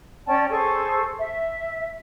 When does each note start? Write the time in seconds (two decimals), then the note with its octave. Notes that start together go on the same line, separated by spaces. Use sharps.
0.27 C#4 D5 G5 A5
0.49 G#4 A4 C5 C#6
1.18 E5